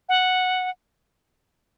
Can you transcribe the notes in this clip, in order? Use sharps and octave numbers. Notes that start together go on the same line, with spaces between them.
F#5